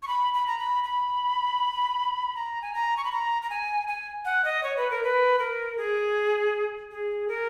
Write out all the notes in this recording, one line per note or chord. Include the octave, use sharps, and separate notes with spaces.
C#6
B5
B5
A#5
B5
B5
A#5
G#5
A#5
C#6
B5
A#5
A#5
G#5
G#5
F#5
D#5
C#5
B4
A#4
B4
A#4
G#4
G#4
A#4